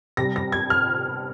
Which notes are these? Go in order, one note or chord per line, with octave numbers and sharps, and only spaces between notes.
C3 G3 A#6
A#6
G#6
F6